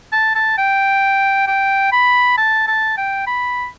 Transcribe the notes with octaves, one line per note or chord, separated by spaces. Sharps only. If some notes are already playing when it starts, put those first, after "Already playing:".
A5
A5
G5
G5
B5
A5
A5
G5
B5